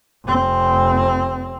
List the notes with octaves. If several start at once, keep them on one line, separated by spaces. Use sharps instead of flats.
F1 C4